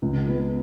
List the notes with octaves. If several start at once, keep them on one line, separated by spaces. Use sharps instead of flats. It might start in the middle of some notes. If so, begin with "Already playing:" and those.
C#2
B3